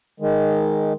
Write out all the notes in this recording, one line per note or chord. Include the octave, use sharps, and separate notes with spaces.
D#3 G#3